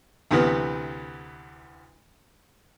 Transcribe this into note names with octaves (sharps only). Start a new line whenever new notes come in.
D2 C3 E3 B3 B4 F6